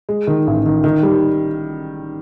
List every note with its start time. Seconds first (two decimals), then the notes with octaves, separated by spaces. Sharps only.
0.09 G#3
0.27 D#3
0.47 A1
0.66 D#3
0.84 D#3
1.03 G3